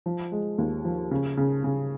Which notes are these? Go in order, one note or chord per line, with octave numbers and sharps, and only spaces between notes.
F3
G#3
D#2
F3
C#3
C#3
C#3